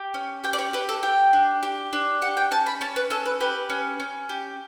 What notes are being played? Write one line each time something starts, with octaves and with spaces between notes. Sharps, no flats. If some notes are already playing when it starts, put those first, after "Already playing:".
Already playing: G4
C#4
G4 G5
D5
C#5
G4 B4
A4
G4 G5
D4
G4
D4
G4 F#5
G5
C#4 A5
B5
C#4 A5
B4
C#4 A4
B4
G4 B4
C#4
C#4
G4